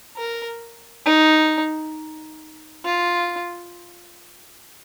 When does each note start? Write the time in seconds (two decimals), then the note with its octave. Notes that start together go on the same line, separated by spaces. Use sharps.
0.17 A#4
1.06 D#4
2.85 F4